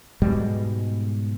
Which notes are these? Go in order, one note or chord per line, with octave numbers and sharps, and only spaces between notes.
G#2 B2 G3 G#3